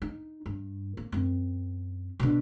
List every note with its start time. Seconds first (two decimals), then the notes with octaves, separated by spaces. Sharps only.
0.02 D#4
0.46 G2
0.97 A#3
1.12 F#2 C4
2.20 B2 D3